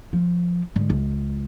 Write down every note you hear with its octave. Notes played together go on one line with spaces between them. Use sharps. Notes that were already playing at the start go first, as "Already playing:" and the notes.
F3
G#2 D3
C#2